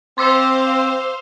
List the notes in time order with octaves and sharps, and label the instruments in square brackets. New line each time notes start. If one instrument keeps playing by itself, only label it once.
[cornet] C4 [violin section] C5 F5 [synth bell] C6 D6 E6